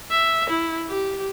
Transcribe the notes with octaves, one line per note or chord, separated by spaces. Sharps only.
E5
E4
G4